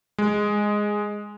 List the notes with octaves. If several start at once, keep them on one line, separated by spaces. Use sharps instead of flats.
G#3